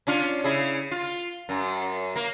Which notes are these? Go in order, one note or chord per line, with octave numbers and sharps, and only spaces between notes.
C#4 D4 F4
C#3 E4 G#4
F4
F#2
A#3